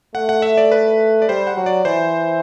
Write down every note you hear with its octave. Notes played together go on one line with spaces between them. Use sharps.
A3 F#5
F#5
E5
D5
B4
D5
G3 C5
F#5
F#3
D5
E3 C5